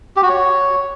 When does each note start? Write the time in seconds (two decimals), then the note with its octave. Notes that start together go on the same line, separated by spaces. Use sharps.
0.16 G4
0.23 F#4
0.29 C#5